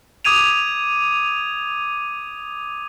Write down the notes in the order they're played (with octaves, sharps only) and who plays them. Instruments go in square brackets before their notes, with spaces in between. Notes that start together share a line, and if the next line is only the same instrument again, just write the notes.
[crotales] D6 D#6 G#6 D#7 F7